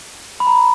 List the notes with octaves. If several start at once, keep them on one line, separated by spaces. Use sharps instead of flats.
B5
A#5